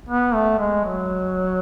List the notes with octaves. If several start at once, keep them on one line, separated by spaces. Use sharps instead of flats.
B3
A3
G#3
F#3